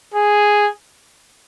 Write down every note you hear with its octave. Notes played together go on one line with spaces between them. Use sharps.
G#4